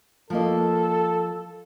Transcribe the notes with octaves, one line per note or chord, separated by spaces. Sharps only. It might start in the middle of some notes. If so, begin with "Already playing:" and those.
F3 A#3 A4 D#5